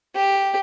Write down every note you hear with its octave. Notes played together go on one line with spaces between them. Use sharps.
G4